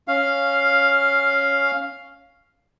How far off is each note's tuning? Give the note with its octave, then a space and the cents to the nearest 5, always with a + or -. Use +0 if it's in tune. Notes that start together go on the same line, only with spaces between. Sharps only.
C#4 +0 F5 +0